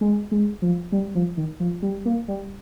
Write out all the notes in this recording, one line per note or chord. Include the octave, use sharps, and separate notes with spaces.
G#3
G#3
F3
G3
F3
D#3
F3
G3
A#3
G3